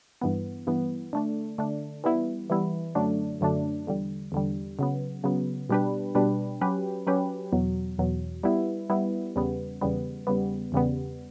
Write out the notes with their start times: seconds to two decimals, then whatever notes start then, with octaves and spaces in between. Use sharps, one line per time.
0.21 G2 E3 B3
0.67 G2 E3 B3
1.13 D3 A3 D4
1.58 D3 A3 D4
2.04 E3 G3 B3 E4
2.50 E3 G3 B3 E4
2.95 F#2 D3 F#3 A3 D4
3.41 F#2 D3 F#3 A3 D4
3.87 E2 D3 G3
4.32 E2 D3 G3
4.79 C#3 F#3 B3
5.24 C#3 F#3 B3
5.69 B2 G3 D4 G4 B4
6.15 B2 G3 D4 G4 B4
6.61 F#3 C#4 G4 B4
7.07 F#3 C#4 G4 B4
7.52 E2 B2 F#3
7.98 E2 B2 F#3
8.43 G3 B3 E4
8.90 G3 B3 E4
9.36 E2 C#3 G3 B3
9.81 E2 C#3 G3 B3
10.27 E2 C#3 G3 B3
10.72 E2 C#3 G3 B3